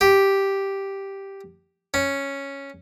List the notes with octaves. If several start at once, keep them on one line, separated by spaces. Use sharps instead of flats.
G4
C#4